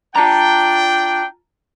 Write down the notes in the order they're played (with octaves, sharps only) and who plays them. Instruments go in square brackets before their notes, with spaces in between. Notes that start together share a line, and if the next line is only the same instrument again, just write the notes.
[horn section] D4 G5 [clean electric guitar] F4 A5 A#5